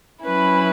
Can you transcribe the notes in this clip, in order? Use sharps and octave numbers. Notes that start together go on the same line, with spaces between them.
F#3 C#4 E4 B4